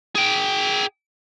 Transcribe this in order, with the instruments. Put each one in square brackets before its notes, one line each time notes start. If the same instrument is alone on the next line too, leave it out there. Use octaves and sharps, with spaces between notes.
[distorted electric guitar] G#4 G5